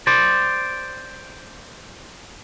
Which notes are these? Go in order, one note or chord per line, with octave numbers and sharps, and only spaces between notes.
C5 D5